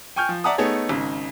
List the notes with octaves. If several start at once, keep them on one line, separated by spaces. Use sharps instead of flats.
G5 G#5 C#6 F6 G6
F3
D5 E5 F#5 A5 A#5 D#6
A3 B3 D#4 G#4 A4 C#5
G#1 C#3 D#4